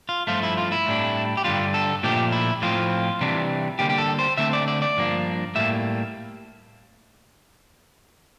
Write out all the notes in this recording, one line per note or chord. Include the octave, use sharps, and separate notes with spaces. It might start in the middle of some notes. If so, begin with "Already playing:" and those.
F4
G2 F3 A3 F4
E4
F4
E4
A2 G3 D4
G4
G2 D3 G3 F4
A4
A#2 F3 A3 D4 G4
E4
A2 F3 C4 F4
C3 E3 G3 D4
D3 G3 A#3 G4
G4
A4
C5
D3 A3 C4 E5
D5
D5
D5
G2 F3 A#3 D4
A2 G3 A#3 E5